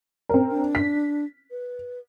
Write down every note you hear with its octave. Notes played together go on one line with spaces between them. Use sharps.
C4 A#4
D4
B6
B4